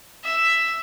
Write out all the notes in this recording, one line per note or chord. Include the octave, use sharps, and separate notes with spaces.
E5